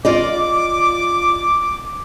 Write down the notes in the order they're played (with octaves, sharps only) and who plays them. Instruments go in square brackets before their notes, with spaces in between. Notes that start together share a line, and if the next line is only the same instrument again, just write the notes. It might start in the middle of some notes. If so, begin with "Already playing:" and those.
[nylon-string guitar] F4 D5 D#5 [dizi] D6